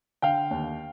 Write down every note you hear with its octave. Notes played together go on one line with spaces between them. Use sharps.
D3 F5 G5
D#2